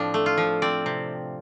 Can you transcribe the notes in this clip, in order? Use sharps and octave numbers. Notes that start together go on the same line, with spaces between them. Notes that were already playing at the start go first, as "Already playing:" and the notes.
Already playing: A2 F3 C4 D4
A3
F4
F3
C4 D5
C3